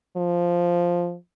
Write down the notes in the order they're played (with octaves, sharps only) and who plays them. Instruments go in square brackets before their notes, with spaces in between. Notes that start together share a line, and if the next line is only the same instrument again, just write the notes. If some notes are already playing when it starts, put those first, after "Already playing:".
[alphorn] F3